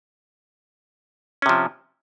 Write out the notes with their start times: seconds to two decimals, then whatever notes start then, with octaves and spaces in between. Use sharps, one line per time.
1.42 C#4
1.46 C3
1.49 F3